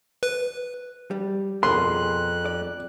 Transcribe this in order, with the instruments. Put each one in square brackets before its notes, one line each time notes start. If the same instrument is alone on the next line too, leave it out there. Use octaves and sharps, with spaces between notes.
[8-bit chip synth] B4
[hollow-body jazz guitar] G3
[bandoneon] F2 F#6 [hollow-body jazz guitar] B2 G#4 A#4 [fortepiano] C6
[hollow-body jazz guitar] D5